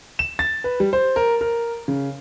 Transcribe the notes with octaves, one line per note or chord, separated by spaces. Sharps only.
E7
A6
B4
G3
C5
A#4
A#4
C#3